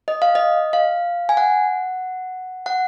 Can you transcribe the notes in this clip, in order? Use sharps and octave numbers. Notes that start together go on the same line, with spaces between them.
D#5
F5
D#5
F5
G#5
F#5
F#5